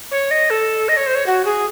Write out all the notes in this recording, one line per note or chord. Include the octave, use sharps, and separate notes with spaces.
C#5
D#5
A4
D#5
C#5
C5
C#5
F#4
G#4